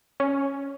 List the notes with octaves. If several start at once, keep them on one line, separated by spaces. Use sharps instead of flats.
C#4